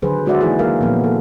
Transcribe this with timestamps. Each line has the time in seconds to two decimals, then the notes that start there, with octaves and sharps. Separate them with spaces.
0.02 D3 D#3 F#3 G#4 B4 C5
0.26 G#3 D4 F#4 C5 D5 E5
0.41 E3 A#3 D#4 E4 F#4 G#4
0.59 F#3 A#3 A#4 F5
0.81 A#2 F3 B3 A#4
1.00 E3 A4